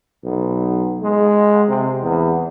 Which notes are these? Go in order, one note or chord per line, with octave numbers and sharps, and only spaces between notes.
B1
G#3
C3
E2